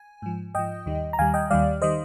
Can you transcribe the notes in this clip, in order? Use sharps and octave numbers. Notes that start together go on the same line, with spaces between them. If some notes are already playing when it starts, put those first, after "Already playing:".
Already playing: G#5
G#2 F3
G#2 F3 D#5 G5
D#2 D#3 G3
A#5
D#2 D#3 G3 F5 G#5
D#5 G5
D#2 D#3 G3 D5 F5
D#3 G3 C5 D#5